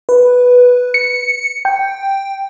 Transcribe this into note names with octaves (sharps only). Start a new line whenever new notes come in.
B4
C#7
G5